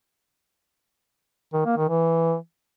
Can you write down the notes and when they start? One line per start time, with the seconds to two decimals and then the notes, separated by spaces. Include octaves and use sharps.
1.53 D#3
1.65 A#3
1.77 D#3
1.89 E3